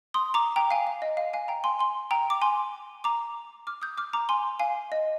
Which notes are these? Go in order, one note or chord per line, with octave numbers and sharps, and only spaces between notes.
C6 D#6
A#5 D6
G5 A#5
F5 G#5
F5
D#5
F5
F5 G#5
G5 A#5
G#5 C6
G#5 C6
G5 A#5
D6
G#5 C6
A#5 D6
D6 F6
D#6 G6
D6 F6
A#5 D6
G#5 C6
F5 G#5
D#5